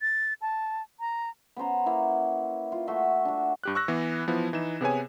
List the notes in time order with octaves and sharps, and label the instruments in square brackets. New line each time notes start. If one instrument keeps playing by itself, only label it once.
[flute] A6
A5
A#5
[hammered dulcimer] B3 C#4 C5 A#5
A#3 B3 E4
F4
A3 F#4 E5 C6
D4 F#4
[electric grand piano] G2 G4 F#6
C#6 E6 F#6 A#6
E3 B3
E3 F3 B3 E4
E3 D#4 E7
C3 B3 G#4 B4 C#5 G#5